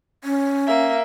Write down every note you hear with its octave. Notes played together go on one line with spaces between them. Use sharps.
C#4
A#3 E5